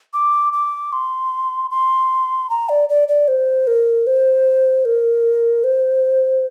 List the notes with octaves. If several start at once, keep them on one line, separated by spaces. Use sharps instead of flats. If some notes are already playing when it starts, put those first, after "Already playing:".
D6
D6
C6
C6
A#5
D5
D5
D5
C5
A#4
C5
A#4
C5